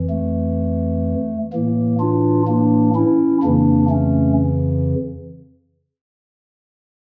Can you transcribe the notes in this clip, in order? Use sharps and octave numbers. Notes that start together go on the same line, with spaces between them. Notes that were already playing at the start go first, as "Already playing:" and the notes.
Already playing: F2 E3
A3
A2 E3 A#3
D4 F4
A#3 D4
C#4 E4
F2 C#3 E3 A#3 D4
A3 C#4